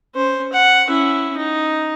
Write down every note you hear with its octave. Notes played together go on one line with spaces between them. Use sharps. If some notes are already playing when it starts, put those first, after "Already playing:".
C#4 C5
F#5
C#4 E4
D#4